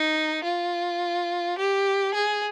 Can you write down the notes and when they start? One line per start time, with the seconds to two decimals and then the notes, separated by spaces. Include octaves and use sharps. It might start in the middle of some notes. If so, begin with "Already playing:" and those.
Already playing: D#4
0.44 F4
1.58 G4
2.14 G#4